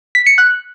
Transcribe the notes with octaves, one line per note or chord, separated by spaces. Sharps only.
B6
C#7
F#6